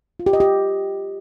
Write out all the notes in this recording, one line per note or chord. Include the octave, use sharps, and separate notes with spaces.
F4
G4
D#5
G4